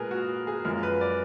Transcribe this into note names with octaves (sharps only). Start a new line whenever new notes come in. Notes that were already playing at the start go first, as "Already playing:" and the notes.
Already playing: A#2 G#3 G#4 A#4 B4
F#4
G#4
F#2 F3 G#3 A#4
B4
D5